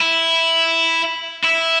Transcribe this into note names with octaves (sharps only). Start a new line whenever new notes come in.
E4
E4